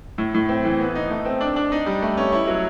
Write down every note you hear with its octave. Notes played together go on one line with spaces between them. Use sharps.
A2
A2
C4
E3
B3
D#4
A3
C4
D4
D4
D#4
G3
A3
C#4
E4
F#3